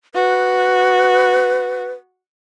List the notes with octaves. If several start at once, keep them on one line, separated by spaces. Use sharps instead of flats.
F#4 B4